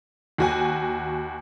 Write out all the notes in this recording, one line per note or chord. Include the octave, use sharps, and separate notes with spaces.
D#2 F#4 G#5